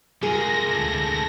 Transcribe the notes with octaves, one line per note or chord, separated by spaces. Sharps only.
C3 G#3 F4 G#4 A#4 A#6
D2 A4 A5